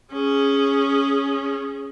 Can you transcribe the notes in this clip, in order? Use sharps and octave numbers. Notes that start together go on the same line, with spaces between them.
C#4 G#4